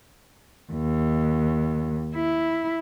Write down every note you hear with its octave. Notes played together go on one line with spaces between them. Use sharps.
D#2
E4